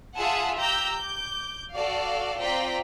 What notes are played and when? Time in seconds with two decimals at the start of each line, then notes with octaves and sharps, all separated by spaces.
0.16 F4 G#4 E5 F#5 G#5 A5
0.58 G4 A#5 E6 G6
0.94 D6 G6
1.73 F#4 A4 D5 F5
2.40 C4 F4 D5 G5 A#5 B6